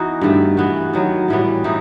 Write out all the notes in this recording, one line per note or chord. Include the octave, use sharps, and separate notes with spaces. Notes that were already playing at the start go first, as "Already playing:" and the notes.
Already playing: E3 B3 D#4 F#4
G2 D#3 A3
E3 B3 F#4
D#3 F#3 B3
A2 E3 G3 B3
A2 E3 A3 D#4